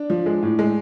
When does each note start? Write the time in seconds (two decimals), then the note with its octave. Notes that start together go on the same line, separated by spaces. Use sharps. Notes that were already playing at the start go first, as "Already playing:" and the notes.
Already playing: D4 D5
0.10 F3
0.26 G#3
0.43 A2
0.59 G#3